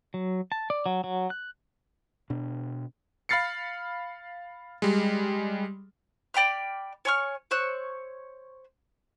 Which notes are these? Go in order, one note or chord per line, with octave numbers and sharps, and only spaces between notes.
F#3
A5
D5
F#3
F#3
F#6
B2 D4
F5 B5 F6 A6 C7 C#7
G3 G#3
D5 G5 B5 F6
C#5 G#5 C#6 F6
C5 C#5 E6 F#6